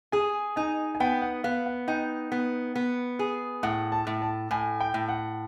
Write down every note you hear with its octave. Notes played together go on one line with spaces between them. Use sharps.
G#4 G#5
D#4 G#5
G#5
B3 G5
F#5
B3 F5
F#5
D#4 G5
B3
B3
G#4
A2 F#5
A5
A2
A5
A2 G#5
G5
A2
F#5